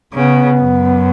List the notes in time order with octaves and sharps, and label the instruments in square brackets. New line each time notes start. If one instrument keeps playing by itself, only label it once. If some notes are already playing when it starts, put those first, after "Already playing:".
[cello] C#3 [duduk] B3
[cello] F#2